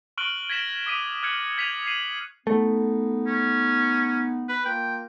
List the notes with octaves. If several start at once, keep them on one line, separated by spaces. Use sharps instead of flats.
C#6 F6 F#6 D7 F#7 G7
G#6 A#6 B6 D7 E7 G7
D6 D#6 B6 D#7
F6 F#6 G#6 C#7 F#7 G7
G#6 B6 D#7 F7
C7 D#7 F#7
A3 B3 D#4
C#4
B4
A#3 F4 A#4 G5